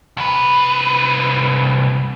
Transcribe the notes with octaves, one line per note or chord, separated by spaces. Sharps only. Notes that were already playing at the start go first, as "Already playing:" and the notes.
C2 B4